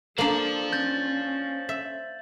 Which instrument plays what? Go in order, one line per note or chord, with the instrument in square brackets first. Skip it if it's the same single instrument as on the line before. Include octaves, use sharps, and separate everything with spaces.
[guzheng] A#3 D4 [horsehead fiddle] A4 [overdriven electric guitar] C5 F5 [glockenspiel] F#7
[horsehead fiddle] C#4 [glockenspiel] G6 A6
[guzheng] E5